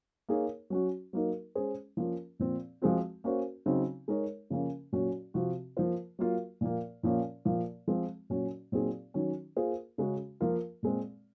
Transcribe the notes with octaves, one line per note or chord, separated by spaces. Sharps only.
A#3 D#4 G#4 C#5
F#3 C#4 F#4
F#3 A#3 D#4 A#4
G#3 C#4 G#4 C5
F3 A#3 C#4 F4
A#2 F3 C4
F3 G#3 C4 F#4
A#3 C#4 F#4 C5
C#3 F#3 C4 D#4
G#3 D#4 A#4 C#5
C#3 F3 A#3 C#4
A#2 F#3 C#4 F#4
C3 F3 C4 F#4
F3 A#3 F4 C5
F#3 A#3 F4
A#2 F3 A#3
A#2 F3 A#3 C#4
A#2 F3 A#3
F3 G#3 C4 F4
A#2 F#3 C#4 F#4
A#2 F#3 C4 D#4 G#4
D#3 F#3 C#4
A#3 F4 G#4 C5
C#3 G#3 C#4 F#4
F3 A#3 F4 A#4
A#2 G#3 C4